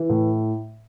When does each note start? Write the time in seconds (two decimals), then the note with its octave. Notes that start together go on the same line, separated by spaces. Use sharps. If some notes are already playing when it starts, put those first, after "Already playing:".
Already playing: E3
0.10 A2